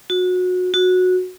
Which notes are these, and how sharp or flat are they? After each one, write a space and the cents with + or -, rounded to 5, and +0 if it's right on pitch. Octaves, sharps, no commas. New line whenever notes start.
F#4 -25
F#4 -15